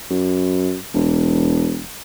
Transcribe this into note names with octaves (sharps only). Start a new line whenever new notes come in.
F#2
E1